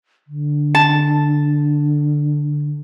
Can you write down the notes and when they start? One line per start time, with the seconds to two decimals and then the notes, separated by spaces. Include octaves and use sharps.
0.27 D3
0.75 A5